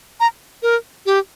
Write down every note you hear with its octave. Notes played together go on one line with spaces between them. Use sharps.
A#5
A#4
G4